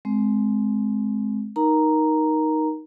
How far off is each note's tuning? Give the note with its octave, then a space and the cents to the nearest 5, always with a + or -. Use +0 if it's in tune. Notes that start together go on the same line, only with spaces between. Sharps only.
G#3 +25 C4 -5
D#4 +0 A#4 +15 A#5 +0